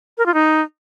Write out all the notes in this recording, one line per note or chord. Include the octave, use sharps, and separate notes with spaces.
A#4
F4
D#4